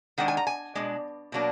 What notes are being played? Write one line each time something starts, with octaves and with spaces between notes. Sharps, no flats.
D#3 G#3 D4 F#5
G#5
A#5
G#5
B2 G#3 D4
B2 F#3 A#3 D4